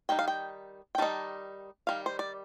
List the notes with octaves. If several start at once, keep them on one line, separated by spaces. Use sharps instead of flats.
D#3 G3 D#4 G5
F5
G5
G5
D#3 G3 D#4 A5
D#3 G3 F5
C5
D5